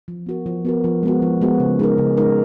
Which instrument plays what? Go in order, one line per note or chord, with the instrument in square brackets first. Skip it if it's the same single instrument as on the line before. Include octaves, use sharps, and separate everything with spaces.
[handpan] F3
B3 F#4 A#4
F3
B3 F#4 A#4
F3
G#3 B3 F#4
F3
G#3 B3 F#4
C#3
G#3 D#4 A#4
C#3
G#3 D#4 A#4